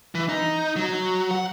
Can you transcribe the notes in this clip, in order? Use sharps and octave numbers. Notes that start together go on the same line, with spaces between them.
E3
D#4
F#3
F#5